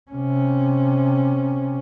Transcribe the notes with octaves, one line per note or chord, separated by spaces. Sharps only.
C3 C#4